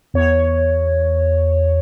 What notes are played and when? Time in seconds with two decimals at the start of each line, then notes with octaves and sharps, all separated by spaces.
0.14 E2 C#5